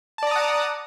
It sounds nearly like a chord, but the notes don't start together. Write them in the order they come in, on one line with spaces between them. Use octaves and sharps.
A5 D5 A#5 D#6 F#5